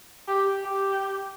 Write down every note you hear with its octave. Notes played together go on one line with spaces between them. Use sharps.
G4
G4